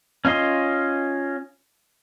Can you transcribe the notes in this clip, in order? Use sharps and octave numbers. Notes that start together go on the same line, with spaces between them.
C#4 F4 D#5 C6